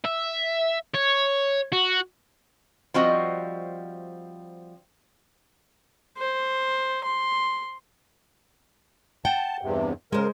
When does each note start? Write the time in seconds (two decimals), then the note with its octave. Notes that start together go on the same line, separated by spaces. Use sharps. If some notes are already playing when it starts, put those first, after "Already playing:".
0.04 E5
0.94 C#5
1.73 F#4
2.94 F3 G3 C4 F#4 D#5
6.18 C5
7.04 C6
9.25 F#5 G5 A5
9.61 E2 G2 C3
10.12 C#3 G#3 A#4 C5